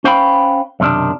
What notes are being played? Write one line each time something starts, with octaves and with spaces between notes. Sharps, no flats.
C#4 C5 F5 G5 B5
B1 F#2 C3 D#3 D4